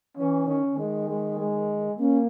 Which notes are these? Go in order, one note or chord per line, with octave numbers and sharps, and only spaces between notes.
E3 C#4
D#3 C#4
D#3
G#3
G#3
G#3
A#3 C#4